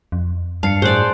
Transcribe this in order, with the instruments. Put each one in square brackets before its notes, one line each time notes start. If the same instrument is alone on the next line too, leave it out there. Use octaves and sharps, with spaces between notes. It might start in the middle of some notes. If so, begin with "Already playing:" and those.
[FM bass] F2
[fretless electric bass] G2 [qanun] F5 [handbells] A5 C7 C#7
[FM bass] A2 [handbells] F#4 G#4 F#6 [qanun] C5 D5